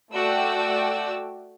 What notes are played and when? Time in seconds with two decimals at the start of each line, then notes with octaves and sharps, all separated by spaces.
0.13 A3 F#4 D5 G5 E6